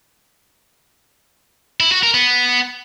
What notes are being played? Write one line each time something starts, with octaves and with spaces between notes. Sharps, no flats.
E4
F#4
A#4
B3